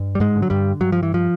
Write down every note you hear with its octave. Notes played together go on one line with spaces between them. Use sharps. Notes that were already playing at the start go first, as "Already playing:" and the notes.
Already playing: G2
G3
G#2 G#3
D3
F#3
G2 G3
G2 F#3
F3
E3
F3